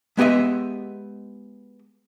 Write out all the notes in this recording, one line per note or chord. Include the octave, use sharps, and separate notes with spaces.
G#3 B3 G4 D#5 E5